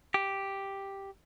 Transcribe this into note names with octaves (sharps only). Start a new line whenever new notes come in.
G4